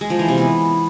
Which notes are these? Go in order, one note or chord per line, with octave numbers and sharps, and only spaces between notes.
G#3
F3
E3
C3
B3